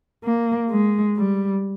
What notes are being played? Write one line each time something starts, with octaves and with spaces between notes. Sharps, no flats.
A#3
G#3
G3